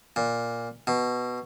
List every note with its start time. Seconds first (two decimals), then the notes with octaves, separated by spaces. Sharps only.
0.16 A#2
0.87 B2